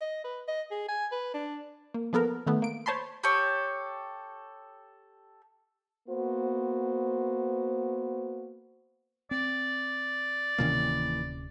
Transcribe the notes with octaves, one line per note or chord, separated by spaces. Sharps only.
D#5
B4
D#5
G#4
G#5
B4
D4
A#3
F3 B3 A4 A#4
D#3 A3 B3
A#3 D7
C5 C#5 A5 B5 C6
G4 A4 C#5
A#3 B3 F#4 C5
C4 D5
D1 C3 D#3 E3 A#3 C#4